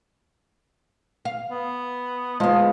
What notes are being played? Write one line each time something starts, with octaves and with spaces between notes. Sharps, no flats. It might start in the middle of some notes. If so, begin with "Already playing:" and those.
F5
B3
F3 G#3 B3 D#5